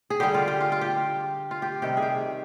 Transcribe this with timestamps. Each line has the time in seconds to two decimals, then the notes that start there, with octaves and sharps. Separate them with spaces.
0.10 G#4
0.20 D3 G3 G4
0.34 F4
0.48 G4
0.61 F4
0.72 F4
0.81 G4
1.51 F4
1.62 G4
1.82 C3 D#3 G3 G4
1.97 G#4
2.02 G4